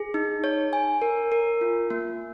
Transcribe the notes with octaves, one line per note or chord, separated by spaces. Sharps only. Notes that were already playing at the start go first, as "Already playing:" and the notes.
Already playing: G#4
D#4
C#5
G#5
A#4
A#4
F4
A#3